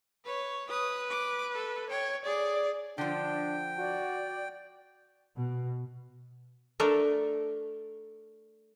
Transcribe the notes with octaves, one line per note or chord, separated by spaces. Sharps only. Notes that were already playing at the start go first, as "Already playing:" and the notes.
B4 C#5
B4 D#6
D6
A4
C#5 G5
G#4 D5
D3 F3 D4 G5
F#4 D5
B2
A3 D4 A4 A#4